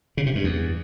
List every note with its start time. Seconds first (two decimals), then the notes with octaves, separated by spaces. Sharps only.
0.17 C#3
0.26 C3
0.35 G2
0.44 E2